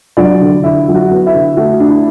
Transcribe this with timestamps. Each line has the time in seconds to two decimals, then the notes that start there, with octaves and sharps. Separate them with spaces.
0.17 F#3 D4 D5
0.41 D3
0.63 D3 E4 E5
0.88 F#3
0.95 F#4 F#5
1.11 B3
1.26 E4 E5
1.34 D3
1.57 A3 F#4
1.80 D4
1.88 E4